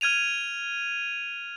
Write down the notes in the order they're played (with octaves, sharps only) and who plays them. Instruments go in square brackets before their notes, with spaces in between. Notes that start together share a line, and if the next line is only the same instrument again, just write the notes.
[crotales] F6 G#6 D#7 F7